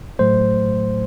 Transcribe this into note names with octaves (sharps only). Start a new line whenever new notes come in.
A2 F#3 A3 C5